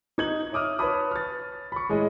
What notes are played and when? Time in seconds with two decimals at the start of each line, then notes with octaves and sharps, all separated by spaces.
0.18 D#4 G#6 F#7
0.52 C#5 E5 D6 D#6 F6
0.79 B4 C#5 A5 B5 D#6
1.11 F6 A6
1.72 B5 C#6
1.89 A2 G#3 G#4 C#5 D#5